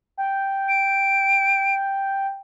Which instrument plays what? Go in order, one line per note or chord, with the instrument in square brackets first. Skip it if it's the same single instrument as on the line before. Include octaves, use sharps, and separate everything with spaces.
[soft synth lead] G5
[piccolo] D7